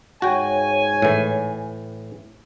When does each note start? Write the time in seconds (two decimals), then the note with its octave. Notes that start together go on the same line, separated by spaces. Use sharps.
0.22 G#2 F#4 C#5 G5 G#5
1.02 A2 E3